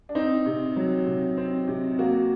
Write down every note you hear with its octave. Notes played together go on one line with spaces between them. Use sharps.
D4
C4 D#4
C3
F#3
C3
C4
C3
A#3 F#4